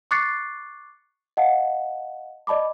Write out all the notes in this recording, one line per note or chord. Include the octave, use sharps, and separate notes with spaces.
C#6 D6 F#6 A6 C7 C#7
D#5 F5 F#5 A5
D5 D#5 A5 B5 D6